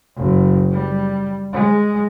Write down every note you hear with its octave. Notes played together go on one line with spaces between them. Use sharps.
F#1
G3
G#3